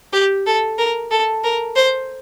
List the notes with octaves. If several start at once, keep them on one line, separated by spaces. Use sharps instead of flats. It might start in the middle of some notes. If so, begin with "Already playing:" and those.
G4
A4
A#4
A4
A#4
C5